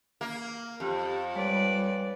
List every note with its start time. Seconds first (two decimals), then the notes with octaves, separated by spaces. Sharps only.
0.21 A#3
0.80 F2 G4
1.35 G3 G#3 B4 C#5 D5